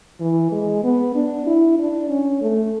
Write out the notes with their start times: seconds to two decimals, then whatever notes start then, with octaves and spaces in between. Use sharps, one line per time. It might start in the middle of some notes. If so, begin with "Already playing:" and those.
0.20 E3
0.52 G#3
0.84 B3
1.15 D4
1.47 E4
1.79 D4
2.10 C#4
2.42 A3